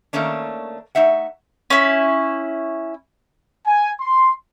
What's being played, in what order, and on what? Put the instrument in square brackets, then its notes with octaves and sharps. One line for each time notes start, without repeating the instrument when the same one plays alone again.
[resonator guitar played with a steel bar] D#3 A3 A#3 C#4 D4
A3 D#4 E5 F#5
[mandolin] C#4 E4
[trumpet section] G#5
C6